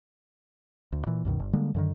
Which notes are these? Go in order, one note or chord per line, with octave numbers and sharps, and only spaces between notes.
D2
A#2 E3
C2 F#2 B2 D#3
G1
D3 G3 G#3 A#3
F#2 D3 D#3